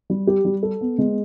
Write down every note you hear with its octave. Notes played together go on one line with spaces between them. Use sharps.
G3
G4
G3
A4
B3
G#3